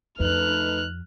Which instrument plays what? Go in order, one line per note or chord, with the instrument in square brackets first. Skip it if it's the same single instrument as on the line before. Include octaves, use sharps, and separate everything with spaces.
[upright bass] F2 [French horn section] A3 D#4 B4 [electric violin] F6 F#6